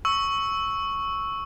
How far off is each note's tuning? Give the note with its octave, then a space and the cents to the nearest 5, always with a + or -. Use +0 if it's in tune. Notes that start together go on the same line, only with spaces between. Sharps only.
C#6 +0 E6 -10